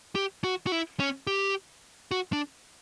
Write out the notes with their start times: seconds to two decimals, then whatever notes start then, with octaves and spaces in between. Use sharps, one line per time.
0.15 G4
0.44 F#4
0.67 F#4
0.72 E4
1.00 C#4
1.27 G4
2.11 F#4
2.33 D4